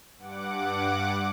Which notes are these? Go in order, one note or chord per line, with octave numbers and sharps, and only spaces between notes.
G2 F#5 D6